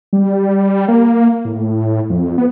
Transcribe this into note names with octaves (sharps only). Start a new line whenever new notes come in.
G3
A#3
A2
F2
B3